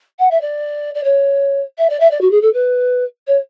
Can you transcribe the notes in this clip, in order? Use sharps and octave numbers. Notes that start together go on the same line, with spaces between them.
F#5
E5
D5
D5
C#5
E5
D5
E5
D5
F#4
G#4
A4
B4
C#5